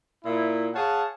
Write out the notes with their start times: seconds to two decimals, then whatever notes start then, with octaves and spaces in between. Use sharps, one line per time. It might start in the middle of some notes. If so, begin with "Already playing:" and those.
0.24 A#2 E4
0.74 G#4 C#5 F5 F#5 A5